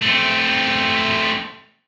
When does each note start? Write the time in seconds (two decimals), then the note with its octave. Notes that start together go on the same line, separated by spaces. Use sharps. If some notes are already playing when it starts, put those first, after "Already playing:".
0.02 A3 C4